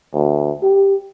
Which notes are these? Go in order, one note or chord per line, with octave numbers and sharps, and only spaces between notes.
D2
G4